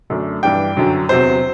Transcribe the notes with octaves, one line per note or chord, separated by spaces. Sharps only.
F#2 D3 A3 D4
G2 E3 G3 D4 G5
F#2 D3 F#3
E2 C3 F#3 C5